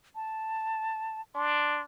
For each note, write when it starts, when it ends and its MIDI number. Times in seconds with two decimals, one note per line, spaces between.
0.15 1.21 81
1.35 1.83 62
1.35 1.82 84